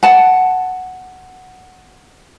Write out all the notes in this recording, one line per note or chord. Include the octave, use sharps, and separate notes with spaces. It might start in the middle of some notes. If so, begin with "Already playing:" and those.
F#5 A5